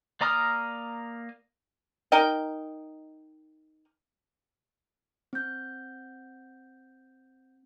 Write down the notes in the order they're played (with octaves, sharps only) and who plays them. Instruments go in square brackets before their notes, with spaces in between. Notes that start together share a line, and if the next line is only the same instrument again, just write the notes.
[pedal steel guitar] A#3 D5 A#5 D#6 F6
[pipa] D#4 A#4 D#5 G5
[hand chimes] C4 G6